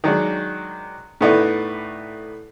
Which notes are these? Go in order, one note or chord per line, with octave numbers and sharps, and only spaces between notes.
D#3 F#3 G#3 D4
A2 A3 B3 D#4 E4 D5